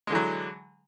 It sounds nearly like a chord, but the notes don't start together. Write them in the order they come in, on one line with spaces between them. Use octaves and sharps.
G#3 D3 E3 F#3